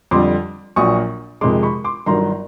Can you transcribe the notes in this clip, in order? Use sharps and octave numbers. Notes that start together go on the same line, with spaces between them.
F2 D3 G3 C6 D6
A#1 A#2 F#3 C#6 D#6
F2 C3 D#3 G#3 C6 D6
B5 C#6
C6 D6
G1 G2 D#3 F#3 A#5 C6